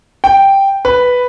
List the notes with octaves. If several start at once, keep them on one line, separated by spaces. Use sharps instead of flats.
G5
B4